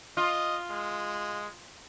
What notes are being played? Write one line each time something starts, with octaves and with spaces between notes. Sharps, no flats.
F4 D#5
G#3